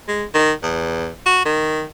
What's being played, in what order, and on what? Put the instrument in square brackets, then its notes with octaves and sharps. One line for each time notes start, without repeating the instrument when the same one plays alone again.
[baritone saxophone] G#3
D#3
E2
F#4
D#3